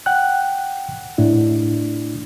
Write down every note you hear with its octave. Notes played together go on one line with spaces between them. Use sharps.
F#5 G5 F#6
A2 D4 E4